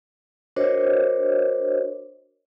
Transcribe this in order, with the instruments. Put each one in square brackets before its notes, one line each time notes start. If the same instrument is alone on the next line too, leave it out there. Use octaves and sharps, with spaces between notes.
[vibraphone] D4 F#4 A#4 C5 C#5 D#5